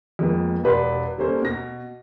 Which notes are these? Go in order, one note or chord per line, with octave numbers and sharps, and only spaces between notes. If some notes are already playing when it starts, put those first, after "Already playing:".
F2 G#3 A#3 B3
E1 G4 B4 D5 C6
G3 A#3 C#4 A4 C5
B2 A#6